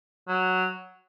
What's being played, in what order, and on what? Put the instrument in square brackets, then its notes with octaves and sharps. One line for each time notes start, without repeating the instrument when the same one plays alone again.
[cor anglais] F#3